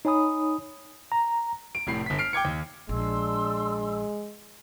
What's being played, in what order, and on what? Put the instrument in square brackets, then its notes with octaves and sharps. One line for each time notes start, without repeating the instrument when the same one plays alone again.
[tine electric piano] D#4 C#5 G#5 B5 D#6
A#5
[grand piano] D7
F1 A2 C7
G1 B6
F6 C7 D7
G5 D6 G#6 C#7
D#2
[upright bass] A#1 [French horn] G#3 [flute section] D4 C6 E6